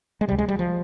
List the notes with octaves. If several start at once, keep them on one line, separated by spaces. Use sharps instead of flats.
G#3
C#2 C3 G3
G#3
G3
F3